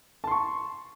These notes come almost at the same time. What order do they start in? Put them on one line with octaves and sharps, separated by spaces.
A5 C6 C#6